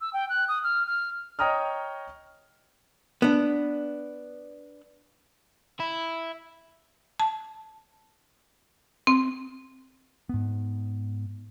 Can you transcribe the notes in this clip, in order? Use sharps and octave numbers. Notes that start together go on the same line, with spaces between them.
E6
G5
F#6
D#6
F6
F6
C#5 D#5 G5 A#5 D#6 F6
B3 D4
E4
A5
C4
G#2 B3